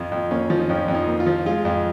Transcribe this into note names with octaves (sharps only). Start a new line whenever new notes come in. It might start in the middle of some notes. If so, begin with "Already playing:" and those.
Already playing: F2 F4
F2
A#3 C#4
F3
D#4
F2 C#4
F2
D#4
A#3
F4
F3
G#3 F4
F2